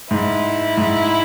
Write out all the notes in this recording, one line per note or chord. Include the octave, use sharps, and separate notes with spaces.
G#2 E4
G#2